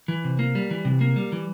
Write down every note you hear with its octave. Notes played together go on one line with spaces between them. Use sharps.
E3
C3
A#3
G3
E3
C3
A#3
G3
E3